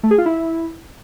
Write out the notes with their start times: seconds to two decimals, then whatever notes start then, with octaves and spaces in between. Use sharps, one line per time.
0.03 A3
0.11 G#4
0.18 F4
0.26 E4